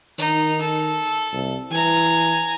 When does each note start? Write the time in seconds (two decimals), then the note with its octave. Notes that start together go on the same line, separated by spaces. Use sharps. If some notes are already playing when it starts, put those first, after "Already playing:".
0.18 D#3 D#4
0.61 A4
1.33 C2
1.71 E3 G#5 A#5